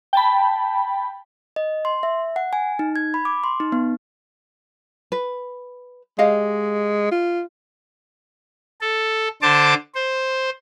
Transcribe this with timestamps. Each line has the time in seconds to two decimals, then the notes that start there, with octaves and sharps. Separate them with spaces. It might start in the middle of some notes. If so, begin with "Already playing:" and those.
0.13 G5 A5 B5
1.56 D#5
1.85 C6
2.03 E5
2.36 F#5
2.53 G#5
2.79 D#4
2.96 G#6
3.14 B5
3.25 D6
3.44 C6
3.60 D#4
3.72 B3
5.12 B4
6.19 G#3 G4 D#5 F5
7.12 F4
8.81 A4
9.42 D3 C5 A5 D6
9.95 C5